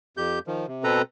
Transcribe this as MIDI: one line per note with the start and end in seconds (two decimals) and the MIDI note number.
0.17 0.39 41
0.17 0.39 67
0.17 0.39 91
0.47 0.66 51
0.47 0.66 53
0.67 0.84 48
0.84 1.02 47
0.84 1.02 60
0.84 1.02 69
0.84 1.02 71
0.84 1.02 82